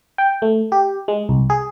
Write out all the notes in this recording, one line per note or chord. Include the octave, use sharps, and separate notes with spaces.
G5
A3
G4
G#3
C2
G#4